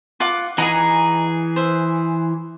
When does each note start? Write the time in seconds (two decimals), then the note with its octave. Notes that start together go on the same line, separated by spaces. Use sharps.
0.20 F4 F#5 D6
0.58 E3 D#4 G#4 F#5 A#5
1.56 C5 E5